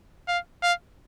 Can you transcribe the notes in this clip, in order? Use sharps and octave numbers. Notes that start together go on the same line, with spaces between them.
F5
F5